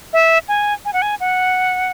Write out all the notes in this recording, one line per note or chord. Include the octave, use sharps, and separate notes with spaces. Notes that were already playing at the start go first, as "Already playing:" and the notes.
E5
G#5
G#5
F#5
G#5
F#5